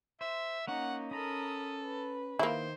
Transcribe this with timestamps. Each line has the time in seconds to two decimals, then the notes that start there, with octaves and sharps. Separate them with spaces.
0.21 C5 E5
0.68 A#3 C#4 D#4 F#5 C#6
1.11 C#4 A4 A#4 A#5 B5 D#6
1.83 B4
2.39 D#3 A#3 E4 C5